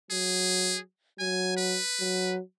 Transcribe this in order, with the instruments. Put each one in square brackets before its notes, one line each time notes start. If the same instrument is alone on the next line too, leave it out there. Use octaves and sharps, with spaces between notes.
[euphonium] F#3 [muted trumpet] G#4
[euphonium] F#3 [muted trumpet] G#5
[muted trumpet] B4
[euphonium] F#3